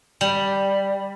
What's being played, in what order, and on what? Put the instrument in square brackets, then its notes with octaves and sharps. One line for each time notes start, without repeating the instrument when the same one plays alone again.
[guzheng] G3